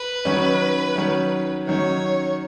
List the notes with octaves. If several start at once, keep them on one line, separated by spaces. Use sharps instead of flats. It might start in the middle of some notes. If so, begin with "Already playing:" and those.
Already playing: B4
D#3 F#3 C#4
D#3 F#3 C#4
D#3 F#3 C#4 C#5